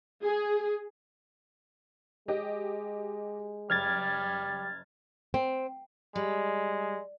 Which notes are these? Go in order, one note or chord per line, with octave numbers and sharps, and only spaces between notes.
G#4
G#3 G4 D#5
F#1 G3 F6 G#6 A6
C4
G3 G#3